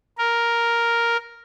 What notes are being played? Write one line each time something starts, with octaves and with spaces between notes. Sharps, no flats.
A#4